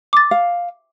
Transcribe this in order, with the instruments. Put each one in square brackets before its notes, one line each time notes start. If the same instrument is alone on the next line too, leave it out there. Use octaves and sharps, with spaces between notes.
[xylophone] D6 A6
[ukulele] F5